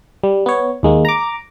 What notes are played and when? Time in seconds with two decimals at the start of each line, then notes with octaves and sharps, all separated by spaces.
0.23 G3
0.46 B3 C#5
0.83 D#2 G#3 A#3
1.05 A#5 D6